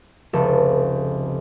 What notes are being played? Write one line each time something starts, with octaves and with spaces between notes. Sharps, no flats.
F1 C#2 A4